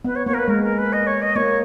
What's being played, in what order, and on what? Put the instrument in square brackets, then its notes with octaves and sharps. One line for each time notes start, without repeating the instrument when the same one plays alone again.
[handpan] B3 [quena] B4
[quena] C#5
[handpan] A#3 [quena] C#5
[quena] A#4
B4
[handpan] G#3 [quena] A#4
[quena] A#4
B4
D#5
C#5
D#5
[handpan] A#3 [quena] C#5